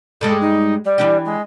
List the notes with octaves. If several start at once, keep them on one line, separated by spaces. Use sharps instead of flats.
G2 G3 G#3 A4
D#4
G3
E3 D4 G4
G#3